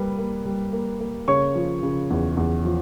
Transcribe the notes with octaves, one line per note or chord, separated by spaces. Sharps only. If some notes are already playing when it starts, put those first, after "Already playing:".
Already playing: G3 A#3 B4
A#3
G3
A#3
A#3
C#3 C#5 C#6
F3
C#3
E2
E2
F3